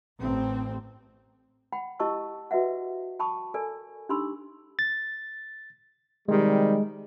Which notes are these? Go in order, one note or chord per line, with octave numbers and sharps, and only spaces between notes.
A1 C4
F#5 G5 B5
E4 G4 D#5 A5 C#6 E6
F#4 B4 D#5 E5 F#5
G5 A5 B5 C#6 D#6
A4 A#4 D5 G#5
D4 D#4 G4 B5 C6 E6
A6
C3 D#3 G3 G#3